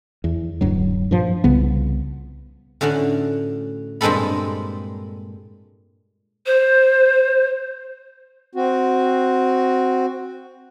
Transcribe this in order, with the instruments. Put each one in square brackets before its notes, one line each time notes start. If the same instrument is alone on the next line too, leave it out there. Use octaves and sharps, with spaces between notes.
[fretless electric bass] E2
D1 G2 F#3
G2 A#2 F3
C2 C#3 B3
[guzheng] A2 D3 C#4 F#4
G2 A#2 G#3 C4 A4 B5
[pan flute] C5
[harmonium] C4 F#4